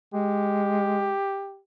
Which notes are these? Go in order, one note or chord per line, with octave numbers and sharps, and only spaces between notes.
G#3 G4